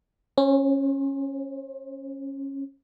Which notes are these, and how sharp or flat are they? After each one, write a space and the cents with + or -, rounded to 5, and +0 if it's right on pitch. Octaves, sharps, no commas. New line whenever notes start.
C#4 -15 C5 +30